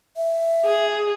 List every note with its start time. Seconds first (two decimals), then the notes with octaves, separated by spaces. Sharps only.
0.17 E5
0.65 G#4